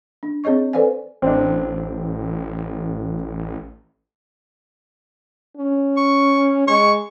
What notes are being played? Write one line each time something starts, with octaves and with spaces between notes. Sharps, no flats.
D4
C4 G#4 C#5 D#5 C#6
A4 B4 C5 D5 F5 G#5
A1 C4 D4
C#4
C#6
G#3 C#6